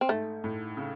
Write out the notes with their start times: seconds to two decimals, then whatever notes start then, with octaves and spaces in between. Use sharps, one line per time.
0.01 C4
0.09 G#2 A3
0.44 A2
0.77 C#3